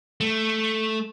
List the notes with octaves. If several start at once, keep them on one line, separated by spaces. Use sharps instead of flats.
A3